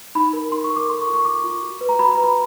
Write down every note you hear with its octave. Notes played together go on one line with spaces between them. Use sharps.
D#4 B5
A#4
D#4 C6
C#6
A#4
D6
A4 C6
C#6
F4
C#6
F4 D6
F4
F#4
B4
A#5
F#4 B5
A#5
B4
B5